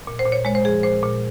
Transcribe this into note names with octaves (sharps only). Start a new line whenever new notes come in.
A#2
C5
A#2
C#5
G#3 C#5
C5
F3 G#4
A#2 C5
A#2